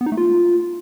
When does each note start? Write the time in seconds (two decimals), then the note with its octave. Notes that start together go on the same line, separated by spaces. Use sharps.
0.01 B3
0.06 D#4
0.12 A3
0.17 F4